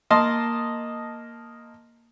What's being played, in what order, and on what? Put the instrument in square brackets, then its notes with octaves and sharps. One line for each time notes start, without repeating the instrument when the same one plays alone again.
[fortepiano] A#3 D#5 A5 C6